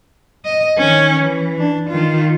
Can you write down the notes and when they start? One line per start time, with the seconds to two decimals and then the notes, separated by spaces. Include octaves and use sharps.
0.45 D#5
0.78 D#3 C#4
1.20 E3
1.59 D4
1.90 D#3 F4